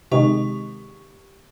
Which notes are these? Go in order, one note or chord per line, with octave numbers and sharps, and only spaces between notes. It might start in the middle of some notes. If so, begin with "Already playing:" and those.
C3 D#3 G#3 G4 C#6 F7